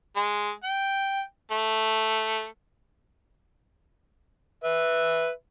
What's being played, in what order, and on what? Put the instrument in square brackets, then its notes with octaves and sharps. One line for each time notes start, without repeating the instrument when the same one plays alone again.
[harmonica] G#3
G5
A3
B4 E5